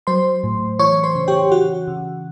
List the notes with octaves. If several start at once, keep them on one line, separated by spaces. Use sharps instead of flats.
F#3 C5 C6
A2
E3 C#5 C#6
C5 C6
C#3
G4 G5
E3 F#4 F#5
C#3